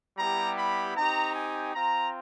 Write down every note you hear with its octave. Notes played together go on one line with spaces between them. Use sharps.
G3 B3 E4 G4 A#5
B5
C4 D#4 G4 A#5
G#5
C4 F4 A#5